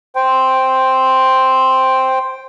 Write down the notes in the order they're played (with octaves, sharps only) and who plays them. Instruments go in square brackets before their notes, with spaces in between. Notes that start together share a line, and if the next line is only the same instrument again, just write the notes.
[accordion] C5 G5